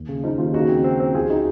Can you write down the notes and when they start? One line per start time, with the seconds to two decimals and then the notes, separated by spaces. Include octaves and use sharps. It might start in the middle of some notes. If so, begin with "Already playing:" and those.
Already playing: D#2
0.09 C#3
0.23 F3 D#4
0.38 D#2 F4
0.53 C#3 D#4 F#4
0.69 C4
0.84 C4
1.00 C4
1.14 C#2 F4 G#4
1.30 D#4 F#4